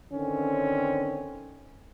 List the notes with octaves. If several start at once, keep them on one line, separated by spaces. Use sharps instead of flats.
D3 D#3 C4 C#4